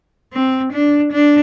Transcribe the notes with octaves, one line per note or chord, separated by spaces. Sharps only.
C4
D4
D4